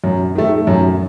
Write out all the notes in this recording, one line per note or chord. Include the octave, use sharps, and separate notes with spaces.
F#2
D#3 A3
F#2